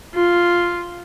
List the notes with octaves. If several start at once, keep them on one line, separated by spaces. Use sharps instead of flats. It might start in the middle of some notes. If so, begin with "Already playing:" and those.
F4